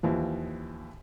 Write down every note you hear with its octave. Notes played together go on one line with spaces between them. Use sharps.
D#2 E3 F3